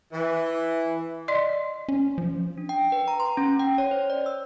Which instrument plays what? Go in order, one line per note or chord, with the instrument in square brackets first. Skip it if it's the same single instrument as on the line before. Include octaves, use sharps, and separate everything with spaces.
[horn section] E3
[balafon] D5 D#5 C6
[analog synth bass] C#4
F3
[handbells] D4
G5
B4
A#5
C6
C#4
G5
C#5
C5
D5
E6